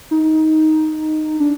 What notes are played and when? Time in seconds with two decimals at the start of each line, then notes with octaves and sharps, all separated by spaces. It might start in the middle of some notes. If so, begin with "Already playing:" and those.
0.11 D#4
1.40 D4